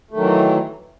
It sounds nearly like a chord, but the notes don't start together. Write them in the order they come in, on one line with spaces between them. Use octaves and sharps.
A3 D#3 F#3 E3